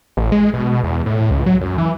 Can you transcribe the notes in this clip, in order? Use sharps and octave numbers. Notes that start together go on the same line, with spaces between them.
A1
G#3
B2
E2
A2
C#2
F#3
F#2
E3